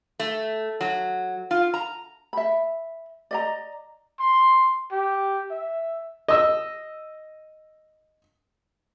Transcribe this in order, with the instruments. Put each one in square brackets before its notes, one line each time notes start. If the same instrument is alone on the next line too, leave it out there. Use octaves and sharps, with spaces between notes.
[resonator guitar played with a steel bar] A3
F#3
F4
A#5
[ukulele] E5 B5
D5 D#5 A#5
[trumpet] C6
G4
E5
[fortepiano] D#5 E6